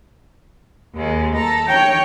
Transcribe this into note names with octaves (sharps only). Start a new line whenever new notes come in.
D#2 G#3
A4 A#5
C#5 G5